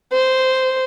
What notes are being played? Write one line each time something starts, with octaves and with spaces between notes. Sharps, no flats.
C5